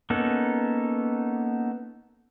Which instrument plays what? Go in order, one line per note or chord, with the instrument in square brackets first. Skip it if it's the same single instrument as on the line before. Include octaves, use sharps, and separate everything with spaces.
[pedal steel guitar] A#3 B3 C#4 D#4 A4